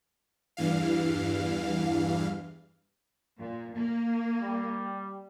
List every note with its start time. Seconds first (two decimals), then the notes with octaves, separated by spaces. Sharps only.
0.57 E2 G2 E3 F5
3.38 A#2
3.76 A#3
4.43 G3